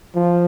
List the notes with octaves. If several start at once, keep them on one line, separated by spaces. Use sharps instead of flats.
F3